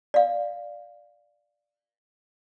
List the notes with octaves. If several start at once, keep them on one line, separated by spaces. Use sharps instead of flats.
D5 F5